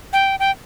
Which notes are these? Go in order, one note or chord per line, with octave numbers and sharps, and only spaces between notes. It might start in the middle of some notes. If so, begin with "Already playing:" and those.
G5
G5